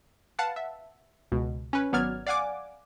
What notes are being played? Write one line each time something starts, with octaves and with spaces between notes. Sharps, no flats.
B4 F5 F#5 A5
E5
C#2 B2
C#4 B4
G#1 F#3 B3 D5 F6 G#6
D5 F5 F#5 G#5 D6